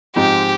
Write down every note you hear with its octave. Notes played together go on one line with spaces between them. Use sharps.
G#2 F3 G#3 C4 G4